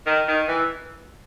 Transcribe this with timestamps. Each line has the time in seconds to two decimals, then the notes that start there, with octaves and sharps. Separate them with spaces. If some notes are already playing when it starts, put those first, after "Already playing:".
0.06 D#3
0.28 D#3
0.48 E3